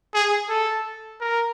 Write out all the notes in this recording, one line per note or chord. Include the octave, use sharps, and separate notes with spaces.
G#4
A4
A#4